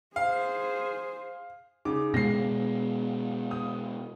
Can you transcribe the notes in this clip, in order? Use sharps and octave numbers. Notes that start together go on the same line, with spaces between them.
G#4 C5 F5
C#3 D#4 D6
B2 G#3 A#6 C7
D#6